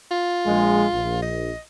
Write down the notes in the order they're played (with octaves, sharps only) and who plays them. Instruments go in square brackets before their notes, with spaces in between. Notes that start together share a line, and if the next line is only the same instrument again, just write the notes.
[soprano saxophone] F4
[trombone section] A#1 G#3
A#1
[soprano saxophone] D#5